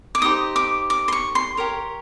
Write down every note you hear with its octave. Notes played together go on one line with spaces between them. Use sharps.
D6
D#4 G4 C5 D#6
D6
D6
C6
C#6
C6
G4 A#4 C#5